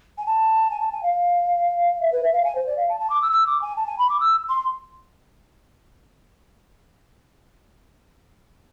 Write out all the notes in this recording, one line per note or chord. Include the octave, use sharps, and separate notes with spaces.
G#5
A5
G#5
A5
G#5
F5
E5
B4
E5
F5
G#5
C5
D5
F5
A5
A5
D6
E6
E6
D6
G#5
A5
G#5
B5
D6
E6
C6